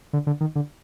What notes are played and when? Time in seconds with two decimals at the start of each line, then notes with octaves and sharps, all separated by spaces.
0.13 D3
0.27 D3
0.41 D#3
0.56 D3